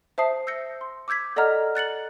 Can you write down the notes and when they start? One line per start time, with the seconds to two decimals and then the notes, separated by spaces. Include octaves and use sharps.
0.18 C5 E5 A5 D#6 C7
0.47 E6 G6 A#6 C#7
0.81 C6
1.08 D6 E6 G6 G#6 B6
1.36 A4 D5 D#5 F#5 A#5 F6
1.75 F#6 A6 C#7 F#7